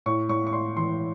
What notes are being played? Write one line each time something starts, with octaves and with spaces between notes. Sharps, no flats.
A2 C#6
A2 C#6
C#6
A2 C6
E3 C6